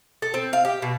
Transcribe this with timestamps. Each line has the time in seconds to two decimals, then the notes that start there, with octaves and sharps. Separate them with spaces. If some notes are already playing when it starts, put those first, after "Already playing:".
0.22 A4
0.34 C4
0.53 F5
0.65 G4
0.82 B2